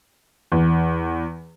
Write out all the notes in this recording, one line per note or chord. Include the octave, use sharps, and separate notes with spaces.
E2